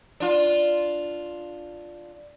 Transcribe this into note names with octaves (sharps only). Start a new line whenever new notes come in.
D4 F4